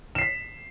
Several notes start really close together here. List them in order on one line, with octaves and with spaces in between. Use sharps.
E7 C7 B6